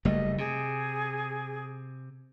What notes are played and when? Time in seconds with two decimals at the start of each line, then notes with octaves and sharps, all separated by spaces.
0.05 F#1 G3 A3 D#5
0.38 C3 G#4